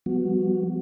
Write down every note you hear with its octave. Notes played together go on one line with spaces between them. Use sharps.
F3 G3 B3 F#4